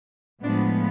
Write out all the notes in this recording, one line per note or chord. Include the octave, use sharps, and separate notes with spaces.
A2 F3 G#3 B3 D4